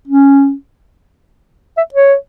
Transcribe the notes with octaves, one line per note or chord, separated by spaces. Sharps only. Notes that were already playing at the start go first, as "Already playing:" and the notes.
C#4
E5
C#5